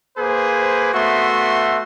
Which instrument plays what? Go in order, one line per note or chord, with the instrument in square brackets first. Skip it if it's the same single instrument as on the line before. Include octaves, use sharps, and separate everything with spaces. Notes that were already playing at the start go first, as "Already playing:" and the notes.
[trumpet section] A#3 G#4 B4 C5
A3 B3 F#4 E5 C6